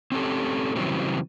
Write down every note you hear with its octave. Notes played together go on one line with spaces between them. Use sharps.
C4 C#4 G4 A4
C#3 E3 F#3 G3 C4